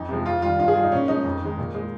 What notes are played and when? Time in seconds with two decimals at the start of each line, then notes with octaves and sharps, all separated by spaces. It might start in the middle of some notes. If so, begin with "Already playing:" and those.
Already playing: F2 D#4
0.09 C3 F3 G#3
0.26 F2 F4
0.42 D#3 G3 F4
0.59 G2 F4
0.68 G#4
0.75 G3 F4
0.83 D#4
0.92 A#2 C#4
1.08 F3 G#3 D#4
1.25 F2
1.42 D#3 G#3
1.58 A#2
1.75 G#3